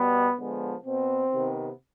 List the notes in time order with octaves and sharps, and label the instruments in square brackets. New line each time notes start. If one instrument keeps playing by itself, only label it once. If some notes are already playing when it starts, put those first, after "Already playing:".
Already playing: [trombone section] B2 G3 B3
D3 F3 G#3 B3
B2 B3 C4
C3 D#3 B3